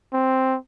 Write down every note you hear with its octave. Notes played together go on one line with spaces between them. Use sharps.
C4